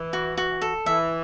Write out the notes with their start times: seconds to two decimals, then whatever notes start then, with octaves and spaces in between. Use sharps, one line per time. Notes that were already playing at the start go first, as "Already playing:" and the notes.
Already playing: E3
0.13 F#4
0.37 F#4
0.61 A4
0.86 E3 E5